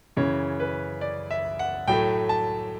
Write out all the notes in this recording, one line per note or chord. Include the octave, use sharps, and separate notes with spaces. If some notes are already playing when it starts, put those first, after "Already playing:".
F#2 C#3 E3 C#5
B4
D5
E5
F#5
A2 F#3 A3 G5
A5